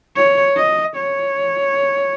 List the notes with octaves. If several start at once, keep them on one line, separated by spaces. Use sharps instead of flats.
C#5
D#5
C#5